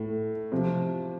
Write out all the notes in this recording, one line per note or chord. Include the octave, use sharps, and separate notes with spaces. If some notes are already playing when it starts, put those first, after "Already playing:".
Already playing: A2
C3 F3